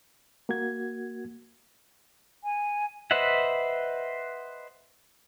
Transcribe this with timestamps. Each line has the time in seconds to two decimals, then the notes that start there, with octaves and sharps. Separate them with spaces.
0.49 A#3 F#4 G#6
2.44 G#5
3.11 B4 C5 D#5 E5 F#5